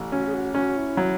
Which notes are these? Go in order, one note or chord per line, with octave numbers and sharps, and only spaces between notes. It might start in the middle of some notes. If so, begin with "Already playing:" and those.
Already playing: A1
C#4 F#4
G#4
F#4
C#4 F#4
E4
F#3